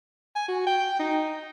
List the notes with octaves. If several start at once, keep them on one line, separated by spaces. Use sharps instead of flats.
G#5
F#4
G5
D#4